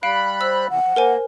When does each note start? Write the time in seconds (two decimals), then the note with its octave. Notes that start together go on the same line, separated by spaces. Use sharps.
0.03 G3 F5 B5 F#6 D7
0.41 C5 E6
0.70 E2 C3 E3 F#5
0.85 F3
0.96 A#3 A#4 C5 G#5